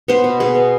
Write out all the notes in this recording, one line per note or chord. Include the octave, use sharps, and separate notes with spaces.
B3 C5
B2
B2 G#4
B3